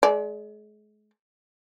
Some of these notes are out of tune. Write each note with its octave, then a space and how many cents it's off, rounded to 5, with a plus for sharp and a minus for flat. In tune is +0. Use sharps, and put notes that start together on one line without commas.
G#3 +35 D5 -10